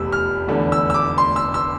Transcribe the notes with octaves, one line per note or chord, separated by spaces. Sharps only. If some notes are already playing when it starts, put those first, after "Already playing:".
Already playing: F1 E2 C3 E6
F6
F1 E2 D3
E6
E6
D6
C6
E6
E6